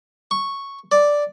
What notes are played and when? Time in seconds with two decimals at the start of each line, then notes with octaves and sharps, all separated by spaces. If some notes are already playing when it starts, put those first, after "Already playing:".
0.31 C#6
0.92 D5